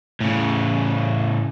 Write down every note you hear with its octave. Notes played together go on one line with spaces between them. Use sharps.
A2 C#3